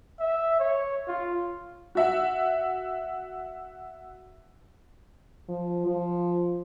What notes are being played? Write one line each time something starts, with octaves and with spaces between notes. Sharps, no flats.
E5
C#5
F4
F#4 E5 F#5
F3
F3